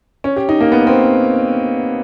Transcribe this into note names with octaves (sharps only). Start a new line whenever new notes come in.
C#4
G4
D#4
A#3
B3
C4